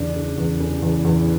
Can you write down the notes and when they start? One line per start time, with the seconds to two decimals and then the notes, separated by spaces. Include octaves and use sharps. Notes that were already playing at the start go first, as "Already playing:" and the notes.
Already playing: E2 C#3 D4
0.16 C#3
0.38 E2
0.60 C#3
0.82 E2
1.05 E2